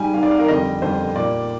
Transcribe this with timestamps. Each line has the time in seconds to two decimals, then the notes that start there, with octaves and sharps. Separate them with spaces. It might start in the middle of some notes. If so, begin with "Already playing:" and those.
Already playing: G#2 G3 G#5
0.14 G#2 G3 F5
0.23 D5
0.31 F5
0.40 A#4
0.48 F2 D3 G3 D#5
0.82 F2 D3 G3 C5
1.15 A#2 G3 D5